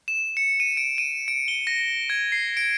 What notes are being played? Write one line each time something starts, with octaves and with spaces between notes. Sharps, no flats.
E7
C#7
D#7
D7
D#7
D7
G7
A#6
G#6
C7
D7